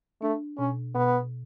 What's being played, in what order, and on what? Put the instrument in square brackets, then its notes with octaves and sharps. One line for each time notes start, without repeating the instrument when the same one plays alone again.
[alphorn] A3 [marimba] D4
[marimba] B2 [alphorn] C#4
[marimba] B2 [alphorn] B3